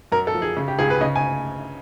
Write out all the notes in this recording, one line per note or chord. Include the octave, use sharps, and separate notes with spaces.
F#2 A#4
A4
F3
G#4
C#3
G4
C#2 G#4
B4
C#3 D#5
G#5